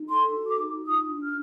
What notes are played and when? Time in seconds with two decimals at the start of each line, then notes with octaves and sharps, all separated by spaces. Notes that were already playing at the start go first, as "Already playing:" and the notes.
Already playing: D#4
0.08 A4 C6
0.33 F#4
0.46 D6
0.59 D#4
0.85 F4 D#6
1.11 D4
1.23 F6